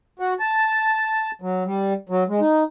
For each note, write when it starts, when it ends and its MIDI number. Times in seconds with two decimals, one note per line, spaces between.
0.20 0.34 66
0.40 1.31 81
1.42 1.64 54
1.65 1.93 55
2.09 2.24 54
2.28 2.40 56
2.40 2.63 63